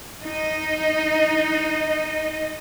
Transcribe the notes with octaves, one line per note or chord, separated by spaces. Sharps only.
D#4 D#5